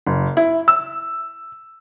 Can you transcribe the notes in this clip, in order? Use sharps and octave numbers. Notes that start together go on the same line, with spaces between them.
F#1
E4
E6